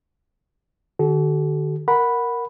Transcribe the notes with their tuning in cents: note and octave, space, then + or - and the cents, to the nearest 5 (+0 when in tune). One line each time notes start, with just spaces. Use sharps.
D3 +40 F#4 +40 A4 -40
A#4 +0 F#5 -5 B5 +0